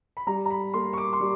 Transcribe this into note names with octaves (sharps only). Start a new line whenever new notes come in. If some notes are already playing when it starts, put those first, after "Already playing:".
B5
G3 A#5
A#5
B5
A#3 C6
C#6
D6
C6
G3